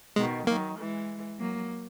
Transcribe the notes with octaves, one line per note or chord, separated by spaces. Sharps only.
B2 D#3 G#3
D#3 F#3 A#3
E3 G#3
F#3 A#3